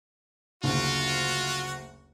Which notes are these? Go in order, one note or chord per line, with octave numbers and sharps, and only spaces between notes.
F#1 D2 F4 F#4